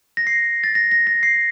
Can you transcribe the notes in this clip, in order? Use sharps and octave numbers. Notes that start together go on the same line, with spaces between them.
A#6
C7
A6
A#6
A#6
A#6
C7